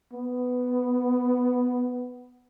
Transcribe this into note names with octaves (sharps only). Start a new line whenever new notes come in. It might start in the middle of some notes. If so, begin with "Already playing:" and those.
B3